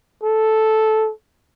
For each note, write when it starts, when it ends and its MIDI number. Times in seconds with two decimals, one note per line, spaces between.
0.23 1.11 69